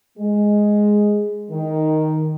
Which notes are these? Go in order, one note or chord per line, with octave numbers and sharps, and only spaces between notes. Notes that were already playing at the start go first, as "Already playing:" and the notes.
G#3
D#3